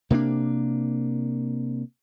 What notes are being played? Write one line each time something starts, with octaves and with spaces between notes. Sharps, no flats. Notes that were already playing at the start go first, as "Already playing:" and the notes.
C3 A#3 B3 D4